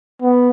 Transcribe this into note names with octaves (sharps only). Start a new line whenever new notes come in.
B3